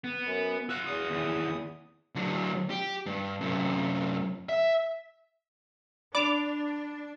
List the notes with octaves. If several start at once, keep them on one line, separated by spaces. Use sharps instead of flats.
B3
F#2
F#4 F5 E6 F#6
E2 D#6
D#2 E3
D3 F#3
G4
G2
F#2 C3
E5
D4 D5 B5 D6 E7 F7